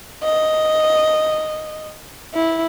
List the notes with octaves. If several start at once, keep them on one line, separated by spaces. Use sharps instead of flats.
D#5
E4